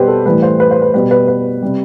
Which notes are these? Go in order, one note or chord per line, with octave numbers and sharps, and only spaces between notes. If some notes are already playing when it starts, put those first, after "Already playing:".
Already playing: B2 G3 G4 B4 C5
A4
A2 E3 G3 B4
C5
B4
C5
B4
B2 G3 B4
B4
B4
C3 G3